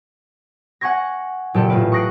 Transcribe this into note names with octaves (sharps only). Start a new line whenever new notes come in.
F#5 G#5 C#6 G#6 A#6
F#1 A#2 G4 A4
A1 F4 B4 D7
C#6 D#6 F#6 A#6 C7 D7